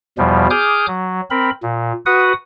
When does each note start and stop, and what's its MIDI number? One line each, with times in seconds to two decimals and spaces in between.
0.18 0.47 40
0.18 0.47 47
0.18 0.47 53
0.18 0.47 55
0.50 0.86 68
0.50 0.86 86
0.50 0.86 87
0.50 0.86 89
0.50 0.86 91
0.88 1.21 54
1.30 1.50 60
1.30 1.50 70
1.30 1.50 83
1.62 1.92 46
2.06 2.33 66
2.06 2.33 71
2.06 2.33 78
2.06 2.33 87